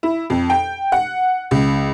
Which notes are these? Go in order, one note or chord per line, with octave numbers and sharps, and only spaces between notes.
E4
F2
G5
F#5
C#2